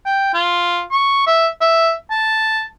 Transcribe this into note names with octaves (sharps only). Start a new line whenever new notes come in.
G5
F4
C#6
E5
E5
A5